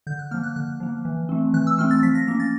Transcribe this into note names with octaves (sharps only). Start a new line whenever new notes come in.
D3 G6
F#6
F3 A#3 F6
F#6
D3 F#6
F3 A#3
E3
A3 C4
E3 F#6
E6
A3 C4 F6
A6
F3 B6
A#6
A#3 C#4 A#6
A6